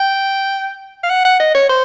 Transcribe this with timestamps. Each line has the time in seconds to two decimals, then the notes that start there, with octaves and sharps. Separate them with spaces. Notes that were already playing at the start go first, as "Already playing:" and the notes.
Already playing: G5
1.04 F5
1.10 F#5
1.25 F#5
1.39 D#5
1.55 C#5
1.69 C5